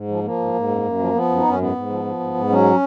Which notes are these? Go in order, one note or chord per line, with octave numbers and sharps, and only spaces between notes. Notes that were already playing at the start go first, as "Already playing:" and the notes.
Already playing: G#2
F3
F3 A#3
G#2
G#2
F#2
F#2
F3
F3 B3
F#2
F#2 D#4
C#4
G#2 B3
G#2
F3
F3
G#2
G#2
F#3 C#4